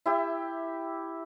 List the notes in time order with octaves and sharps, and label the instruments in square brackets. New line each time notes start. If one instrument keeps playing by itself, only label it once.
[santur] E4 G4 E5